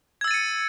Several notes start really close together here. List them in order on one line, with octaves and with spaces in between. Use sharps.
G#6 E6 A6 D#7 C#7